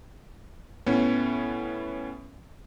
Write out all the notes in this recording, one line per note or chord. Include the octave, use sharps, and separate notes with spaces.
A2 B3 C#4